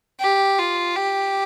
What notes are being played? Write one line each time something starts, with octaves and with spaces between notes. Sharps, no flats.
G4
F4
G4